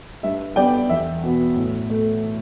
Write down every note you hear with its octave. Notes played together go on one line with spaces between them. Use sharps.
G2 E5
G3 B3 D5 G5
E2 E5
B2 B3
A2
A3